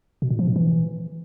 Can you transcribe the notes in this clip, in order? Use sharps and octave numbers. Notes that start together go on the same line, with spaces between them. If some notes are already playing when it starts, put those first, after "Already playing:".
B2
A#2
F3
A#2
E3